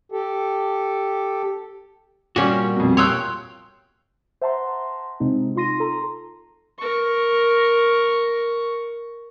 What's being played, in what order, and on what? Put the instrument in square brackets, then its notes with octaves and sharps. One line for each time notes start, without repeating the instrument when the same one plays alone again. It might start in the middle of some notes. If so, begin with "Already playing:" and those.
[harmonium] G4 A4
[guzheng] A#2 C#4 [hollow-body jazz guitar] G3 A#3 F#4
[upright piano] F2 B2
[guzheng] C#5 F5 G5 [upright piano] C6 E6 F#6
[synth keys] C5 E5 F#5 A5 A#5 C6
C3 G#3 C4 D#4
D#4 F4 C6 A#6 D#7
A4 A#5 C6
[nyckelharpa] A#4 C#6